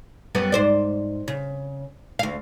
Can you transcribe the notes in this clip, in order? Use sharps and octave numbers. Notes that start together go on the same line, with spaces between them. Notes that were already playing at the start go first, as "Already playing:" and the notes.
F#2 G3 B3
G#2 C5 D5
C#3
D2 F5